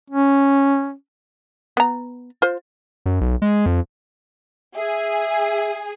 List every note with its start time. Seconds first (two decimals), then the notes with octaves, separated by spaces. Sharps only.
0.10 C#4
1.77 B3 A#5
2.42 F4 C5
3.06 F#2
3.21 B1
3.42 G#3
3.66 F2
4.77 G#4 E5